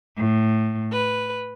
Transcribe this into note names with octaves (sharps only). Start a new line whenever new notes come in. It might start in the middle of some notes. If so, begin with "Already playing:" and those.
A2
B4